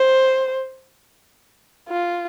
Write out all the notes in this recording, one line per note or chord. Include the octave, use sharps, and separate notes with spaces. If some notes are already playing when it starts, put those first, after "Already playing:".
Already playing: C5
F4